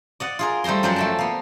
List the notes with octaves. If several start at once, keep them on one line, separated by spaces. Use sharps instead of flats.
D5 D#5 F#5
F4 G#4 A#4
G3 A3 C5 A#5 C6
F#2 F3 F#3 A#4 C5 D5
A3 G5 A5
A#3 B3